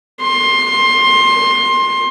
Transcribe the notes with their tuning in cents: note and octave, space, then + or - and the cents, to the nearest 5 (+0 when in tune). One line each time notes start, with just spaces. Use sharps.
C6 +20